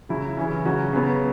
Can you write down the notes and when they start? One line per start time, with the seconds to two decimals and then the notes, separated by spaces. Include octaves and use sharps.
0.09 C#3 F#3 E4
0.37 C#3 E3 C#4
0.65 C#3 F#3 C#4 F#4
0.93 C#3 F#3 B3